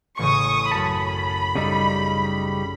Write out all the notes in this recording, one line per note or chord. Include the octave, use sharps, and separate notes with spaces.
A1 C#3 C#6 D#6
F#2 A5 B5 D#6 C#7
C#3 G3 D#4 A4 D#5